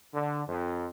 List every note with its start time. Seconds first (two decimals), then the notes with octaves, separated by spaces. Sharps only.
0.14 D3
0.47 F2